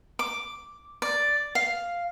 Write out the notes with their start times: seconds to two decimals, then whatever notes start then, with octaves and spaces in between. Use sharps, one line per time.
0.19 D6
1.02 D5
1.55 F5